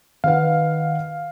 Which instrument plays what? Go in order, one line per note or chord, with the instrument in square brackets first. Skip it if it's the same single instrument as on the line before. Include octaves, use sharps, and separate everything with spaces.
[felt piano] D#3 B4 F#5 [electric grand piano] F5